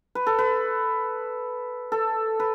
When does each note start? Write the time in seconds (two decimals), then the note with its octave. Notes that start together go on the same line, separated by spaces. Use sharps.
0.15 B4
0.27 A4
0.39 B4
1.92 A4
2.40 B4